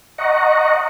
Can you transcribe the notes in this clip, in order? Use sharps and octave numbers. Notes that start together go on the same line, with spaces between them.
D#5 F#5 A#5 C#6